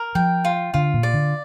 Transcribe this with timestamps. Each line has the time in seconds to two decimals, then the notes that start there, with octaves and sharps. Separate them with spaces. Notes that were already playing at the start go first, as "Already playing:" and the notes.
Already playing: A#4
0.15 F3 G5
0.45 F4
0.74 D3 F4
0.94 A#2
1.03 D5
1.14 D3